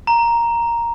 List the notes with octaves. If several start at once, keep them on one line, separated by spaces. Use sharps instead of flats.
A#5